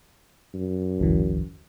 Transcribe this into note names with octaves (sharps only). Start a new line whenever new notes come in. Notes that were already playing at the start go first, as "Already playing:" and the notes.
F#2
G#1 D2 E3